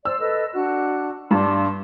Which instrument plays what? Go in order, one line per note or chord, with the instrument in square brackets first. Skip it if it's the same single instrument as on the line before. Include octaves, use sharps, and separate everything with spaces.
[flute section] C5 D5 [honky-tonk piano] E6
[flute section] A4 B4 D#5
D4 F#4 F#6
[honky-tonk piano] G2 [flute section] D4 C6